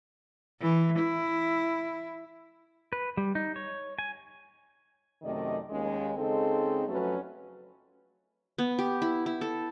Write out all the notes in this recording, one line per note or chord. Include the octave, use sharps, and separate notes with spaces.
E3
E4
B4
G3
D#4
C#5
G#5
F#2 C3 D#3 A3 D5 D#5
D#2 G#3 C#4
C#3 G#3 C4 D#4 A4
F2 F#3 A3 C#4 F#4 B4
B3
G4
E4
E4
A4